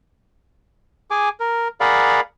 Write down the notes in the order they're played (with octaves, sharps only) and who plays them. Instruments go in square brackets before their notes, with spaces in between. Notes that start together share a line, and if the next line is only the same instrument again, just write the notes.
[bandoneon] G#4 G#5 D6
A#4
G#4 A#4 D5 F5 F#5 B5